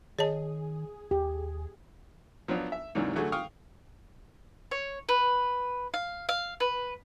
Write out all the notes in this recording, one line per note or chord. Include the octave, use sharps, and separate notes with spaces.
D#3 G#4 C#5 D#5 A5
D#2 G4
F3 F#3 B3 D4 F4
E5
D#2 G#2 C3 E3 F#3 D4
D3 F#3 A3 F#4 G#4
F5 G5 C#6 D#6 F6
C#5
B4
F5
F5
B4